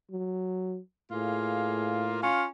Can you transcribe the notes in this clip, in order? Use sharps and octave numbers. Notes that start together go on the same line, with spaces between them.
F#3
A2 A#3 F4 G#4
C#4 F4 F5